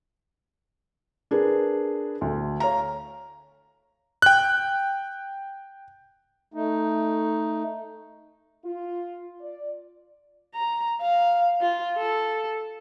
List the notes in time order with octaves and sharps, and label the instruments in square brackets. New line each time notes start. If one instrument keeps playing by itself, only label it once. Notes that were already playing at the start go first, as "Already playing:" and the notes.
[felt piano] D4 G#4 A#4 B4
D2
C#5 F5 A#5
[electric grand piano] G5 F#6
[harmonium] A3 D#4
[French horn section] F4
D5
[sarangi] A#5
F5
F4
A4